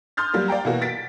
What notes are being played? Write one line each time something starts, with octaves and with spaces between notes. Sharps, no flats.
C6 D#6 F6 G6 A6
F#3 G3 A#3
D5 F5 G5 A#5
B2 E3 A#3 F#4
A6 B6 D7